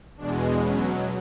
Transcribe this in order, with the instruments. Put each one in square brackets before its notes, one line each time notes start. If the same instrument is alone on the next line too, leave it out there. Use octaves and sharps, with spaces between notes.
[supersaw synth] E2 B2 G#3 D4
B2 F#3 C#4